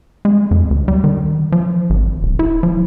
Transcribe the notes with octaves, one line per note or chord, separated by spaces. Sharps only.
G#3
F2
D2
G3
D#3
F3
G#1
D1
E4
F3